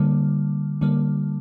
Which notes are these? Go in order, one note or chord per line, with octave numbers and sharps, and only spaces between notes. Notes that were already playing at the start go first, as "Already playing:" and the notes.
Already playing: D3 G3 A#3
D3 G3 A#3